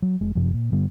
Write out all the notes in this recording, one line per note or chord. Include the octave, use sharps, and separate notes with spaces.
F#3
F1 G#3
F#1 F#2 C3 F3
A#2
G2 D3 G3 B3